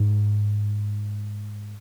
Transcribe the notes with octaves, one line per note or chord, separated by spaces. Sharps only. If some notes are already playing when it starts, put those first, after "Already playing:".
Already playing: G#2